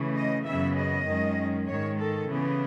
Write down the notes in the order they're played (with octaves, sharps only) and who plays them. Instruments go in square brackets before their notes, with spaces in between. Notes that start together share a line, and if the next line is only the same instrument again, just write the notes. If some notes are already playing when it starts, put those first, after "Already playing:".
Already playing: [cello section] C#3 E3 A3
D#5
F#2 C#3 E3 B3 E5
D#5
F#2 D#3 G#3 C#4
G#2 D#3 G#3 C#5
A4
C#3 E3 B3